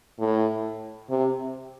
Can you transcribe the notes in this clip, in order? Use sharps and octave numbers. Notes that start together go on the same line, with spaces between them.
A2
C3